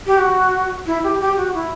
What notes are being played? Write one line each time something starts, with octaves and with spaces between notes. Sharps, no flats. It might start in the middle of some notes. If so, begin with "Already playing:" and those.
G4
F#4
E4
G4
G4
F#4
E4